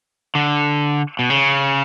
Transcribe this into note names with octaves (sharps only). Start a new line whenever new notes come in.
D3
B2
C#3